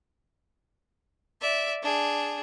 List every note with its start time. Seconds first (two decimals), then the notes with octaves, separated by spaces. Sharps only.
1.41 D5 E5
1.83 D4 G#4